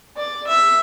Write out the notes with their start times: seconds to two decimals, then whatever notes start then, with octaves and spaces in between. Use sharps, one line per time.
0.18 D5
0.48 E5